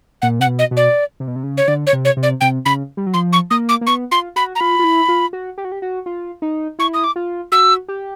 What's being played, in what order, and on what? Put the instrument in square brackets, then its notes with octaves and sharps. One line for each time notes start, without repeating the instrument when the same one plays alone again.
[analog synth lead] A#2 [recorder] F#5
[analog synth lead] C3 [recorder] F#5
[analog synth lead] B2
[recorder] D#5
[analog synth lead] B2
[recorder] D5
[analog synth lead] C3
B2
C3
C#3
[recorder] C#5
[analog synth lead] D3 [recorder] D5
[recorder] C#5
[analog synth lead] C3
[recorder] C#5
[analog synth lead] C3
[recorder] D5
[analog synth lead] C3 [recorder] G5
[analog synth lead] C#3 [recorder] B5
[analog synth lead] G3
F#3
[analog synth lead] F3 [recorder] C6
[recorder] C#6
[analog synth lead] A#3 [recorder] D#6
[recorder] D6
[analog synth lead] A#3
[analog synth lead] B3 [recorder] C#6
[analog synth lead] F4 [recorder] C6
[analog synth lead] F#4 [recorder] B5
[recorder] A#5
[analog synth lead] F4 [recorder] B5
[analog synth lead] F4
E4
F4
F#4
G4
F#4
G4
F#4
F4
D#4
[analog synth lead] E4 [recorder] C#6
[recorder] D#6
D6
[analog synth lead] F4
[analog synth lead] F#4 [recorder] E6
[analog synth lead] G4